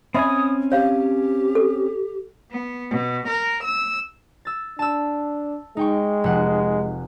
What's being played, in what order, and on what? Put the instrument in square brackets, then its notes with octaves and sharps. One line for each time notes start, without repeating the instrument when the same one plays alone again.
[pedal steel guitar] C4 C#4 G#5 [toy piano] D#5 E5 B5 [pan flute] D#6
[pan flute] G4 [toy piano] C#5 F5
[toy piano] A4
[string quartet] B3
B2
A#4
E6
[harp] E6 A6
[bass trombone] D4 [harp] A5 E6
[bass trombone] G#3 [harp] D#4 G5 C#6
[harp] F1 F#5